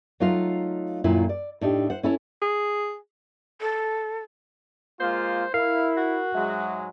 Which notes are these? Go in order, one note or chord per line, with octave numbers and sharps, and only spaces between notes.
F#3 A3 D#4 F4 D#5 F5
F#2 A#2 D#3 A3 E4 F4
D5
A2 D4 D#4 G4
C5 F#5
C#4 E4 A4 C#5
G#4
A4
G#3 A#3 F4 C5
E4 A#4 F5 C7
F#4
G#2 F#3 G#3 E5